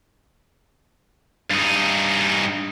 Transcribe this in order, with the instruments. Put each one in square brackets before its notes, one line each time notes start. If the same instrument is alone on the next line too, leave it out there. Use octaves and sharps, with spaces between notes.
[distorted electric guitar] G2 D#4